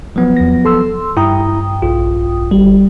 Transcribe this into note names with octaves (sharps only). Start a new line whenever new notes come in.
F3 F#3 B3
E2 A#6
A4 C6 E6
G2 E4 G5 A#5 D#6
A#1 F4
G#1 G3